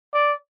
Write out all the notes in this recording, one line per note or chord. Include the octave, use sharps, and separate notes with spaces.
D5